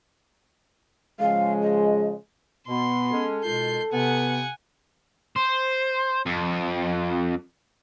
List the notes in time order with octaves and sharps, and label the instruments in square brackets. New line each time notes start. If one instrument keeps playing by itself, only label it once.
[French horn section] C#3 F3 G#3 [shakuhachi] F5
[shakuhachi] D#5
[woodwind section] B2 [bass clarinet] B3 [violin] C6
[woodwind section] G#3 C#4 [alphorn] A4
[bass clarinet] B2 [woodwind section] D#3 G#3 F4 [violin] G6 C7
[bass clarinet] C3 [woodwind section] B3 [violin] F#5 G#5
[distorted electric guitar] C5
F2